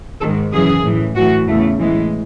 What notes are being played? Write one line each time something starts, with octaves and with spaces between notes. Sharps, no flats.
G#2 D#3 A4
F#2 C#3 E3 G#4
A2 E3
A2 E3 F#4
E2 C#3 E3 A3
A2 E3 G#3